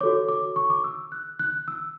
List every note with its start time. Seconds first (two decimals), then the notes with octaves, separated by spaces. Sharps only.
0.01 F#4 A4 C#5 D6
0.29 D6
0.56 C#6
0.70 D6
0.84 E6
1.12 F#6
1.39 F#6
1.68 E6